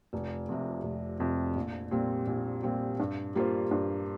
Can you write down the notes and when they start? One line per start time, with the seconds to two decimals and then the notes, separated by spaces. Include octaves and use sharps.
0.13 F1
0.49 F2 C3
0.83 F1
1.20 F2 C3
1.56 A#1
1.91 A#2 G3 C4
2.27 A#1
2.63 A#2 G3 C4
3.00 G2
3.35 G3 A#3 F4 C5
3.71 G2